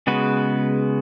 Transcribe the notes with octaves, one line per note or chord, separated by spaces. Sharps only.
C#3 G#3 B3 F#4 B4